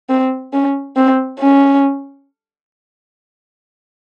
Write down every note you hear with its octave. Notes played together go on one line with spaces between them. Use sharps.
C4
C#4
C4
C#4